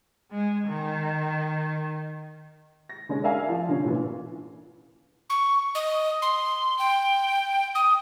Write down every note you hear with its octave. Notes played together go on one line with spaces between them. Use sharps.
G#3
D#3
A#6
D3 G#3 C#4 G#4
A#4 D5 E5 F5 G#5
F3
D3 C#4
A#2 E3
C#6
D#5
C6
G5
D#6